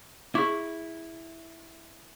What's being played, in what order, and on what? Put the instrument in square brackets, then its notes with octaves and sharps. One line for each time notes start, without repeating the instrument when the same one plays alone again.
[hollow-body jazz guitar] E4 [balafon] G#4 C#6 D6